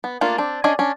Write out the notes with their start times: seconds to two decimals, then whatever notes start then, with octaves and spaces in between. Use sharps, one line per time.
0.04 B3
0.21 A3 A#3 D4 F4
0.38 C4 D4
0.64 C#4 D4 G#4 D#5 G#5
0.79 C#4 D4